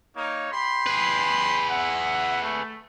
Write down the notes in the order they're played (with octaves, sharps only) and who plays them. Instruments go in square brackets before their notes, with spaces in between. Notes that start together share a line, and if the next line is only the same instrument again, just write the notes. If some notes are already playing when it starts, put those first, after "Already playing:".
[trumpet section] A#3 D#4 C#5
G4 B5 C6
[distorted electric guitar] G#4 B4
[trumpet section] E5 F#5
A3